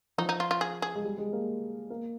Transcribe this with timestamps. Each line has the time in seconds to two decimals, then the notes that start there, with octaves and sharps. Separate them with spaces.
0.18 F3 D#4
0.29 D#4
0.40 F4
0.51 F4
0.61 G#4
0.82 G#4
0.95 G#3
1.04 G3
1.18 G#3
1.33 A#3
1.90 A#3